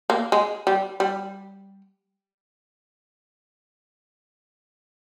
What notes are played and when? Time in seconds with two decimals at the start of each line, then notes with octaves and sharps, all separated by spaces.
0.10 A#3
0.32 G#3
0.67 G3
1.00 G3